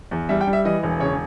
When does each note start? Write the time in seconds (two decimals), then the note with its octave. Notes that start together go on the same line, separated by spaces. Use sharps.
0.11 E2
0.29 G3 E5
0.41 G5
0.47 G3
0.53 E5
0.65 E3 D#5
0.83 E1
1.00 C#3 C#5